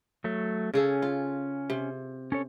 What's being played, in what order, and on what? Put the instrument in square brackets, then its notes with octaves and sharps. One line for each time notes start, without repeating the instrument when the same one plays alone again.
[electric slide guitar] F#3 A3
[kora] C#3 G#4 A4 [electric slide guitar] C#4
[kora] F4
C3
[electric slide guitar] C#4 A4 C#5